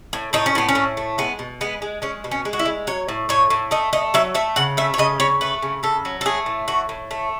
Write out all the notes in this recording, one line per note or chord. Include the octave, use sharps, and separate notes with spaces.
A2
A2 D#4
C#4
A2 B3
C#4
A2
A3
G#3 B3
B2
G#3 B3
G#3
G#3 C#4
B2
C#4
G#3
F#4
E4
G#3
F#3 C#5
A2
A2 C#5
A2
A3 D#5
A3 D#5
F#3 E5
A3 E5
C#3 F#5
A3 E5
C#5
C#3 D#5
C#3 C#5
A3 B4
C#3
C#3 A4
F#3
A4
A3 G#4
A2
A2 F#4
A2
A3